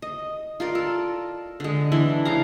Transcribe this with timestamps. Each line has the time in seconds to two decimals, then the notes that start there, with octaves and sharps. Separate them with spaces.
0.02 D#5
0.60 F4 A#4 D5
0.75 A4
1.60 D3 G#3
1.92 E3 D4 E4
2.25 C#3 G#3 F5 A#5